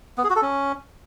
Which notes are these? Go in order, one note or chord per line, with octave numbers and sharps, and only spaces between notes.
B3
G#4
F#4
A4
C#4